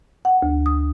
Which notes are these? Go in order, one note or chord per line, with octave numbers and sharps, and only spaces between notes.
F#5
D2
D#6